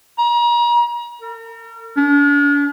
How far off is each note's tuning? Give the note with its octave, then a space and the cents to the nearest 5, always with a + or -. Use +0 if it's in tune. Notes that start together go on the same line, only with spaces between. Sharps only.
A#5 +35
A#4 -40
D4 -40